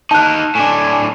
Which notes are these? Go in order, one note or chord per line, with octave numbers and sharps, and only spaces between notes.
D#4 F5 A5 F#6
A2 D4 G#5